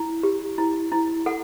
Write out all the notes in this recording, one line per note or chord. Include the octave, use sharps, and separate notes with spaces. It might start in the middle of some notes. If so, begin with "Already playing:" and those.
Already playing: E4
G4
E4
E4
A4 F#5